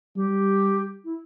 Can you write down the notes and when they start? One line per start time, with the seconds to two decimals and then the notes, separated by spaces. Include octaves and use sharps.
0.16 G3 G4
1.04 E4